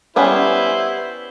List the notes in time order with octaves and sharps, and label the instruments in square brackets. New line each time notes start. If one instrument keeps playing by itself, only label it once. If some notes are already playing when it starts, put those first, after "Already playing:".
[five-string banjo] G3 B3 C#4 [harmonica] E4 B4 C5